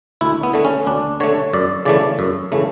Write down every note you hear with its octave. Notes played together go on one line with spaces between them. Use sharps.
D2 E4
B3
D3 A3
C#4
D2 D4
D3 A3 C#5
F#2 D5
C#3 E3 A3 D5
F#2
C#3 E3 A3